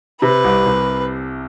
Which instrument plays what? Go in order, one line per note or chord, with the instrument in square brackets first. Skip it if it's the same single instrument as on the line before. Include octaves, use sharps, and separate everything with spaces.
[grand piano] C3 [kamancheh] B4
[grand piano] C2
C2